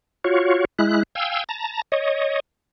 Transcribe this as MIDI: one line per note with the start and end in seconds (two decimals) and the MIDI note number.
0.24 0.65 65
0.24 0.65 66
0.24 0.65 73
0.79 1.03 56
0.79 1.03 64
0.79 1.03 90
1.15 1.44 77
1.15 1.44 79
1.15 1.44 80
1.15 1.44 88
1.49 1.82 81
1.49 1.82 82
1.92 2.40 73
1.92 2.40 75